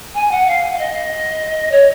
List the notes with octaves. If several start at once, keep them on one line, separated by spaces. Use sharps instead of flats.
G#5
F#5
F5
F5
D#5
C#5